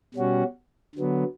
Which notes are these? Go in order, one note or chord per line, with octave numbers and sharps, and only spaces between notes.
B2 G3 C#4 F#4
D3 F#3 B3